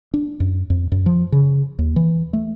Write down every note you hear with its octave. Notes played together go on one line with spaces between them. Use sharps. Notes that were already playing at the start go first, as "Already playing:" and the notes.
D4
F#2
F2
F#2
F3
C#3
D#2
E3
A3